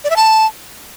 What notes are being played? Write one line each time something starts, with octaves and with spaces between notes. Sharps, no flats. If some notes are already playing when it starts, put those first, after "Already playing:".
D5
E5
A5